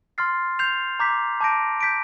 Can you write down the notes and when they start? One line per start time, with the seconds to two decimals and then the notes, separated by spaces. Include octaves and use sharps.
0.18 C6 F6 A6 C7
0.59 G6 C7 F7
0.99 A#5 D6 G6 B6
1.41 A5 D6 G6 A#6 D7
1.81 G6 B6 D7